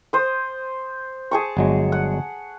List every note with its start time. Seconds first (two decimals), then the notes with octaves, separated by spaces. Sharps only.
0.13 C5 D#6
1.31 G#4 A5 C#6
1.57 G1 F#3 G#3
1.92 F#5